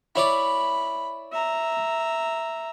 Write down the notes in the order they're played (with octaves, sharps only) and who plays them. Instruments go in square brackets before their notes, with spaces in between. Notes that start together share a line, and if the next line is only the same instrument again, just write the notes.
[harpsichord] E4 C#5 D5 [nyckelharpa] B5
[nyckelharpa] E5 A#5